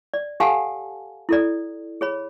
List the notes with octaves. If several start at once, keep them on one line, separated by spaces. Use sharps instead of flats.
D5
G4 A4 F5 F#5 G#5 A5
E4 A4 D5
G#4 C#5 B5